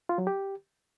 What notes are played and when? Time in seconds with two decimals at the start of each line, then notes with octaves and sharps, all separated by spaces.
0.09 F4
0.18 F#3
0.27 G4